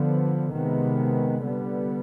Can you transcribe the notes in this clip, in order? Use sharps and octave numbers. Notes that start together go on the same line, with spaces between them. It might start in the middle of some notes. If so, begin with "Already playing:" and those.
Already playing: D3 F3 B3
C3 D#3 G#3 B3
D3 G3 B3